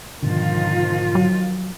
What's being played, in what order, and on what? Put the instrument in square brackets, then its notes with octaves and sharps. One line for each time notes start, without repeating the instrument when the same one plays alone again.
[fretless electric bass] G#2 B2 D3 [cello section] D#3 F3 F4
[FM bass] F#3